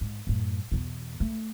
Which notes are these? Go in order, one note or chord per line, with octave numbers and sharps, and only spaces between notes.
G#2
F#2 A2
E2 B2
A3